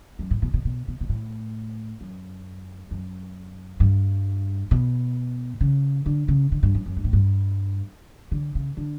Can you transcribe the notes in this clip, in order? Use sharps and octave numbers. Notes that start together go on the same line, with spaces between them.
F#2
A2
B2
B2
B2
B2
B2
A2
F#2
F#2
G2
B2
C#3
D3
C#3
D3
G2
F#2
F#2
G2
A2
G2
D3
C#3
D3